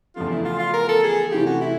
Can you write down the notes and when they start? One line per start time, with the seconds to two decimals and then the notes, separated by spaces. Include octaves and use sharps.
0.16 E2 C#3 F3 A3 F4
0.29 E4
0.45 F4
0.59 F4
0.73 A#4
0.88 A4
1.03 G#4
1.31 C3 E3 A3 C#4 F4 G4
1.46 F#4
1.61 E4